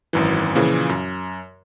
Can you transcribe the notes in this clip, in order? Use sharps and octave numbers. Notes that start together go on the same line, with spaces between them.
G#1 F#2 E3
A#2 C#3 E3 F3
F#2